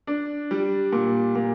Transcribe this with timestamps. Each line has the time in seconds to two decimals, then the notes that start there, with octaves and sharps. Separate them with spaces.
0.07 D4
0.51 G3
0.93 A#2
1.35 A#2